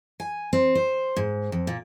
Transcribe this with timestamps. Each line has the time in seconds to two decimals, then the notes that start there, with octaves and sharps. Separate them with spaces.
0.20 G#5
0.53 C4
0.75 C5
1.16 G#2
1.52 F2
1.67 A#2